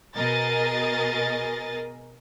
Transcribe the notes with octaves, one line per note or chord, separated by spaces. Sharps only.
B2 G#4 A#4 D#5 A6